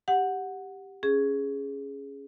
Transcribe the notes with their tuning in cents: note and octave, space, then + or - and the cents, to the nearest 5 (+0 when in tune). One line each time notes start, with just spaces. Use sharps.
G4 +0 F#5 -5
C#4 +0 G#4 +0